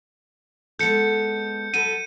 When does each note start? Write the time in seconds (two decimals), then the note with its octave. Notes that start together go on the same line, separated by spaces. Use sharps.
0.79 G#3 B3 A4 G6 C#7
1.74 F#3 A4 B4 D#7